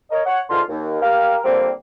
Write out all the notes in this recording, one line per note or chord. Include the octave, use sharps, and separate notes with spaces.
A#4 C#5 D#5
C#5 F#5
G#2 D3 E3 F4 C6
D#2
G4 A#4 F5
D3 F3 G3 A#3 C4